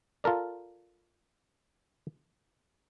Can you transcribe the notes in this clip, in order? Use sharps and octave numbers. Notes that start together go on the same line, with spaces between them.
F4 A4 A#4 D5